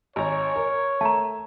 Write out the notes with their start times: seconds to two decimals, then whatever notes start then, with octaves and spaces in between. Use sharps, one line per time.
0.16 G#1 C#5 A#5
0.56 A#4
1.01 A3 A5 A#5